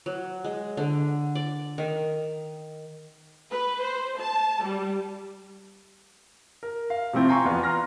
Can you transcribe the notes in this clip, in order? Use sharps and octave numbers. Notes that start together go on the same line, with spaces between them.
F#3
G#3
D3
D5
D#3
B4
C5
A5
G3
A#4
F5
C3 F3 A3 C4 E4 G4
F5 G5 G#5 A#5 C6 C#6
E2 F3 B3 D5 F5
A#5 C6 F6 A#6